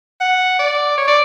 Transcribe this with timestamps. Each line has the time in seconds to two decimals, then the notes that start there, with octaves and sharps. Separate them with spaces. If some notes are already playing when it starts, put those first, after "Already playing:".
0.21 F#5
0.59 D5
0.98 C#5
1.08 D5